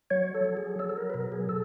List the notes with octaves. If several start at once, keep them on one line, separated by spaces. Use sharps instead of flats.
F#3 C#5
A4
F#3
G#4
F#3 A4
A4
A#4
B4
B2 A#4
G#4
B2 A4